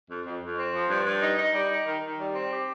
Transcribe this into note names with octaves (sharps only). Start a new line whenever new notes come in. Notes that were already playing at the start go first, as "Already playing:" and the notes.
F2
F2
F2
C4
F3
G2
G2
D#4
D#4
G3
D#4
D#3
D#3
G3
C4
G4